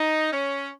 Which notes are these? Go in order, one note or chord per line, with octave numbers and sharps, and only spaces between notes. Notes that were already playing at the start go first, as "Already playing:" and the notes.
Already playing: D#4
C#4